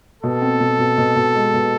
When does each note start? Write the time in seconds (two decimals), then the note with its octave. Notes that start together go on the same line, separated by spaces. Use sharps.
0.23 B2 A4
0.42 C4
0.60 B2
0.79 B2
0.98 B2
1.16 B2
1.35 G#3
1.54 B2